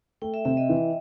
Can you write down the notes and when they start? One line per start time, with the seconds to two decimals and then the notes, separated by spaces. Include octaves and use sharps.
0.22 A3 G5
0.34 E5
0.45 C3 E5
0.57 D#5
0.69 E3